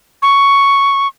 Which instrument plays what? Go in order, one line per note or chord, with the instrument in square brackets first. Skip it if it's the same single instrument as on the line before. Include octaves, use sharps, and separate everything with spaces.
[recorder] C#6